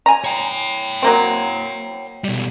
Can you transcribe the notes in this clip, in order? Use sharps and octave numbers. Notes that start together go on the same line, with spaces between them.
G#5 A#5
C#5 G5
F#3 A#3 C4
B2 G3